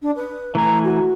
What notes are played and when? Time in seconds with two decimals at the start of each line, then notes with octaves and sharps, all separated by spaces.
0.02 D4
0.15 B4
0.55 E3 A3 G#5 A#5
0.84 F#4